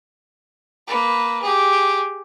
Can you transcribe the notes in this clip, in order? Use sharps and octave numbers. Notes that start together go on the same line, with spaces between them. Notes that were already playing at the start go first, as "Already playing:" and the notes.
A#3 B4
G4 G#4